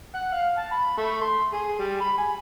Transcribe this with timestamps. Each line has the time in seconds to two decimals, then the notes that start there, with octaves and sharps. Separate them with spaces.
0.15 F#5
0.33 F5
0.58 A5
0.71 B5
0.97 A3
1.21 C6
1.53 G#4
1.79 G3
2.01 B5
2.18 G#5